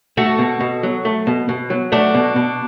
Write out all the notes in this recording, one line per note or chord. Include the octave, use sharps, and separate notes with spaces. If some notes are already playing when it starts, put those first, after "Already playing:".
A3 F#4 A4
B2
B2
F#3
A3
B2
B2
F#3
A3 D4 F#4
B2
B2